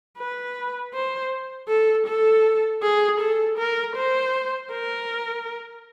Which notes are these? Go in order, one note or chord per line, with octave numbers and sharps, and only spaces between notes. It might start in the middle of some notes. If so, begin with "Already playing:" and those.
B4
C5
A4
A4
G#4
A4
A#4
C5
A#4